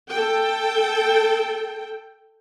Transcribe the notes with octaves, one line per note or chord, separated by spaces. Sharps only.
A4 G5